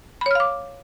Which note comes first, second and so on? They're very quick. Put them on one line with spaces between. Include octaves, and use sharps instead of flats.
B5 C#5 F6 F5 D6